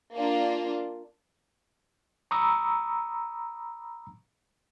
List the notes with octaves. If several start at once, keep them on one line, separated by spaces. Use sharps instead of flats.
A#3 D4 F4
A#5 B5 C#6 D#6 E6